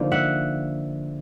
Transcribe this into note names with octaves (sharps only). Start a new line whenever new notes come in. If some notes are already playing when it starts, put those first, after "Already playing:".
Already playing: D3 F3 A#3 D#4
E5 F#5